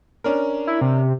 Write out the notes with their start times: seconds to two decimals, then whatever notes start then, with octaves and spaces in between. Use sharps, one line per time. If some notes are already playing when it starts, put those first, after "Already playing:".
0.24 C#4 D4 A#4
0.67 E4
0.81 C3